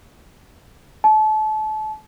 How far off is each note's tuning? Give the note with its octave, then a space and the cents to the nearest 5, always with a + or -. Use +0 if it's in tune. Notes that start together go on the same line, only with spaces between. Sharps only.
A5 -30